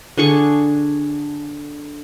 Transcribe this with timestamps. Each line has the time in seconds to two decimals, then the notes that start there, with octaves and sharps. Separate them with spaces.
0.17 D3 D4 G#4 C#6